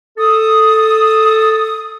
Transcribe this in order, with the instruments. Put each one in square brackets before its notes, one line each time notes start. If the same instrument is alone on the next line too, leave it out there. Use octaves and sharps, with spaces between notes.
[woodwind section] A4 D#6